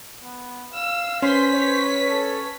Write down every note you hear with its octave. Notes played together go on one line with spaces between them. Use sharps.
B3
F5 E6
C#4 B4 C5 C6 B6
C#5
A4